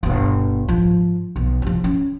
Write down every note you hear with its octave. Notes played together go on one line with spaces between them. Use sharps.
G1 B2
G#2 F3
B1
C3 F3
C#4